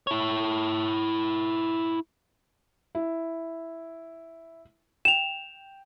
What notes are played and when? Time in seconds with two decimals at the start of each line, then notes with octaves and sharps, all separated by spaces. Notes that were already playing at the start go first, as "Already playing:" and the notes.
0.07 E4 C#5
2.95 E4
5.05 G5 E7 F7